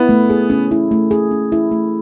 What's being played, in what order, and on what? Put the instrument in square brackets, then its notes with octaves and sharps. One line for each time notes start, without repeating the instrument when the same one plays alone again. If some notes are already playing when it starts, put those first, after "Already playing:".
Already playing: [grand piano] B3 [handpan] E4
[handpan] A3
G#4
C#4
E4
A3
G#4
C#4
E4
A3